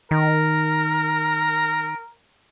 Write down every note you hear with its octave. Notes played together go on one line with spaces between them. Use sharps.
D#3 A#4